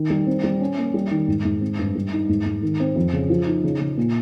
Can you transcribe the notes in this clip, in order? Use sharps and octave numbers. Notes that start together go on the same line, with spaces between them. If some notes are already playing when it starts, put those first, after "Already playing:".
Already playing: D#3
G3
C4
G3
C#4
A#3
G3
D#3
G#2
G#2
C4
G2
G3
D#4
G#2
G#2
D#3
C4
F2
C#3
F3
D#4
C#3
C#3
A#2